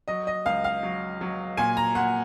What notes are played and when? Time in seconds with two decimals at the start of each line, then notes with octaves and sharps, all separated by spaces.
0.08 F#3 D#5
0.27 D#5
0.46 C#2 F5
0.64 F5
0.83 F#3
1.21 F#3
1.57 A#2 G#5
1.77 A#5
1.95 A#2 F#5